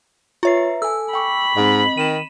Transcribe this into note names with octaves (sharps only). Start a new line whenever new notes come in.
F4 B4 C#5 E5 A#5 C7
A4 G#5 E6
G5 B5 C#6 D6
G#2 C4 D#5
D#3 D#7 E7